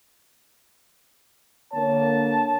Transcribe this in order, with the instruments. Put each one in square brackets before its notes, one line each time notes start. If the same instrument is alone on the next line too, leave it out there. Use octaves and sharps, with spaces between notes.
[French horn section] D3 A#3 C#5 [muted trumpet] A5